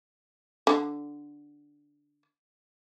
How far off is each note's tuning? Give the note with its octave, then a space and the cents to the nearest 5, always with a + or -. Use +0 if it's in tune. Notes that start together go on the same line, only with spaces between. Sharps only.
D3 -5